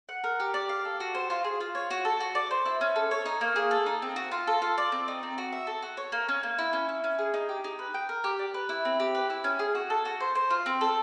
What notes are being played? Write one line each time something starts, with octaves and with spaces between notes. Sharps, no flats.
F#5
A#4
G4
D5
F5
A4
F#4
C5
F4
G#4
F4
C#5
F#4
A4
F#4
D5
C5
E4
C#4
A4
C#5
D#4
A#3
G#4
A4
D#4
C4
F#4
F4
A4
F4
D5
C4
D#4
C4
F#4
E5
A4
F#4
C#5
A#3
C#4
A#3
E4
C#4
E4
C#4
G#4
D#4
G4
D#4
B4
G5
A#4
G4
D5
B4
E4
C4
G4
B4
E4
C#4
G#4
F#4
A4
F#4
C5
C5
F4
C4
A4